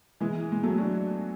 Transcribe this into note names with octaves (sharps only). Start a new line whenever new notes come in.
E3 G#3
G#3
F#3 A3
D4 F#4